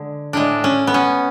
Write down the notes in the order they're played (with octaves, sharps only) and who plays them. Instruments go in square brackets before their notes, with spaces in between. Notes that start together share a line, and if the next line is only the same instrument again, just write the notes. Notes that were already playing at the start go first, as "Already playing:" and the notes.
Already playing: [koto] D3 G#3
A2 G#3 D4
C#4
B3
C#4